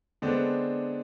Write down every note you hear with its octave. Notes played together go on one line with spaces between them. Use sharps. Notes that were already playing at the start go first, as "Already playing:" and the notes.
D3 G#3 B3 C4 D4